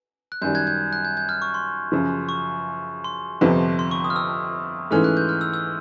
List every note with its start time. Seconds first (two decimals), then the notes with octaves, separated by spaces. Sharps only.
0.32 F#6
0.42 F#2 D#3 G3 G6
0.55 F#6 G#6
0.67 G6
0.93 F#6
1.05 G6
1.17 G6
1.29 F6
1.42 C#6
1.54 C6
1.92 F#2 C#3 F3
2.29 C#6
3.04 C6
3.41 G1 F2 C3 F3
3.79 C6
3.91 C#6
4.04 D#6
4.10 F6
4.16 E6
4.91 G#2 E3 A3 C#4 F6
5.04 F#6
5.17 G6
5.29 F6
5.41 E6
5.54 E6